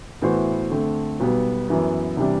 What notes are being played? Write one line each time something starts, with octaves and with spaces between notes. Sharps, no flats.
A2 E3 B3 F#4 C5
D3 A3 C4
B1 B2 G3 B3
F#2 E3 B3
C3 E3 G3 D4